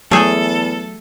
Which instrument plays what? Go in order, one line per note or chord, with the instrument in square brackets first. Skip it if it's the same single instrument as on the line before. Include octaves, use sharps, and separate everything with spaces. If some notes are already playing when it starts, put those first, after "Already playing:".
[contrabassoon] E2 [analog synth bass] F#3 [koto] A3 G#4 [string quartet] A4